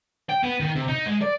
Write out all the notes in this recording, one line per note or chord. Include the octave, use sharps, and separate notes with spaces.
G5
B3
D#3
C3
D#4
G#3
D5